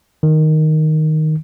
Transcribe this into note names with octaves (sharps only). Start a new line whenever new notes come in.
D#3